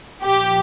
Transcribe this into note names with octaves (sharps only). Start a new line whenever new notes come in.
A#2 F3 G4